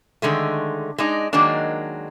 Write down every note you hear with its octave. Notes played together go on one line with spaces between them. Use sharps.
D3 D#3 G#3 A3
G#3 D4 D#4
D#3 F#3 G#3 A#3 D4